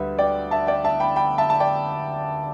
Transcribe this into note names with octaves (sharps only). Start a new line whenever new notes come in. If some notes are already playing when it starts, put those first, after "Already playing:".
Already playing: D2 D3 G3 B4 E5
D5 G5
E5 A5
D5 G5
E5 A5
G5 B5
G5 B5
E5 A5
A5
D5 G5